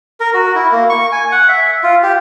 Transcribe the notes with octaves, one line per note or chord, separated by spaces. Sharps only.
A#4
F#4
E4
A#3
C#6
G#5
F#5
E5
F4
G4